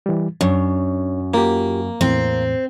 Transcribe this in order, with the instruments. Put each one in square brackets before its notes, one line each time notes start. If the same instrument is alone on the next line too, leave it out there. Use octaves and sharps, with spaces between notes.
[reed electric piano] E3 G3
[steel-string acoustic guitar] F#2 [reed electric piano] D4 C#5
[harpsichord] A#3 [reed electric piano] F4 G4
[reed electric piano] E2 A2 [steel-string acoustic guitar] C4